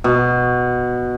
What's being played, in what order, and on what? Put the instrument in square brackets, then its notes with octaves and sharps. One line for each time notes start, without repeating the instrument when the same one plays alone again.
[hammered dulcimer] B2